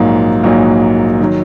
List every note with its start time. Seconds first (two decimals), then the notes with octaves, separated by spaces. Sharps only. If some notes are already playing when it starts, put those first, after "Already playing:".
Already playing: A#1 G#2 F#3 A#3
0.43 A#1 G#2 F#3 A#3
1.21 D#3 F#3